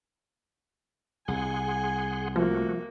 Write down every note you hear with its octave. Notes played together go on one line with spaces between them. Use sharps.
C2 G#4 F#5 G#5 C6
F3 A3 A#3 F#4